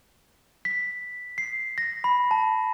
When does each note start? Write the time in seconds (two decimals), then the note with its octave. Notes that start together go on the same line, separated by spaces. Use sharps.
0.65 B6
1.38 C7
1.78 A#6
2.04 B5
2.31 A5